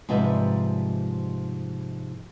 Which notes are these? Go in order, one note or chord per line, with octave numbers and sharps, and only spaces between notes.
G#2 C3 F3 G3 B4 E5